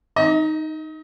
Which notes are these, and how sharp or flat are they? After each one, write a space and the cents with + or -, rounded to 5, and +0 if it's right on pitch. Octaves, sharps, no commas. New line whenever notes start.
D#4 +0 D#5 +35